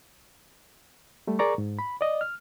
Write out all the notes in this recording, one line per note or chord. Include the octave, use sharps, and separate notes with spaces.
G3 A3
G#4 A#4 D5 A#5 C#6
G#2
B5
D5 D#5
F6